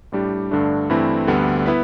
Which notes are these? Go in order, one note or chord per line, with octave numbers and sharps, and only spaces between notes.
A2 G3 D4 G4
G2 D3 A3 D4
G2 E3 A3 C4 E4
D2 D3 G3 B3
B3 E4 B4